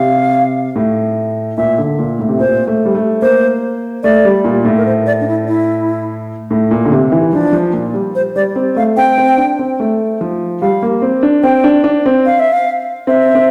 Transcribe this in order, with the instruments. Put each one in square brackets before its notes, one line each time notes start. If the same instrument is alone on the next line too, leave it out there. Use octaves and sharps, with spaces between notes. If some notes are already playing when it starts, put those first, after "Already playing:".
Already playing: [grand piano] C3 [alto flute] F5
[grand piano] A2
[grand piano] A#2 [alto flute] E5
[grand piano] D3
A#2
A2
C3
[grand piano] A#2 [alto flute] C5
[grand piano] A3
G3
A3
[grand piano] A#3 [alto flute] C5
[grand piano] A3 [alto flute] D5
[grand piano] G3
A#2
A2
[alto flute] A#4
C5
D5
D4
E4
E4
[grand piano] A2
A#2
D3
C3
E3
[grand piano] F3 [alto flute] D4
[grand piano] F3
A#2
G3
[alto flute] C5
[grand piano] G3 [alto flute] D5
[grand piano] C4
[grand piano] A3 [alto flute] F5
[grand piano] C4 [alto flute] G5
[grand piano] C4
D4
C4
A3
F3
[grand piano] G3 [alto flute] F5
[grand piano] A#3
C4
D4
[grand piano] C4 [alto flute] G5
[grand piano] D4
D4
C4
[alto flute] F5
E5
F5
[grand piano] C4 [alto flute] E5
[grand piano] C4